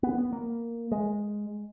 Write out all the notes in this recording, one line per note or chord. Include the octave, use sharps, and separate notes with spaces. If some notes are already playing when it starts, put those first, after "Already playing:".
B3
B3
A#3
G#3